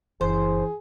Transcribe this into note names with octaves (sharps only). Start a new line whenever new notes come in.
F#1 E3 G#4 C5